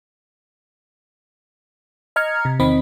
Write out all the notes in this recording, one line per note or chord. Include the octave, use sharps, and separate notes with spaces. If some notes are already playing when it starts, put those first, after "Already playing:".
D#5 A#5 F6 G#6 C#7
C3
E2 D#3 C4 D#5 B5